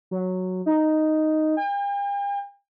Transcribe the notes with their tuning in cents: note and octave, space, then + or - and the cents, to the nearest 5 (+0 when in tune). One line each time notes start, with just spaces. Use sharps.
F#3 -5
D#4 +0
G5 +45